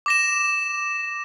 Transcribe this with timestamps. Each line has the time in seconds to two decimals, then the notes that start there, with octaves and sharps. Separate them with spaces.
0.06 D6 A#6 E7